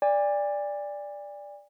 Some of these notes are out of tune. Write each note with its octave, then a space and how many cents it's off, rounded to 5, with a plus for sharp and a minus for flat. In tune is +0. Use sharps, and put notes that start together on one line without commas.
D5 +0 G#5 -45